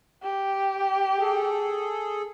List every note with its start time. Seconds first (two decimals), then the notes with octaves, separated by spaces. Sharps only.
0.23 G4
1.19 G#4 A4